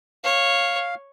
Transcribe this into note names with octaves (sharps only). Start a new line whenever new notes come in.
C#5 F5